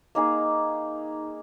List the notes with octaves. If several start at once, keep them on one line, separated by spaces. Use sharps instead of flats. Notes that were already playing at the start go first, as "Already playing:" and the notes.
A#3 D#4 G#4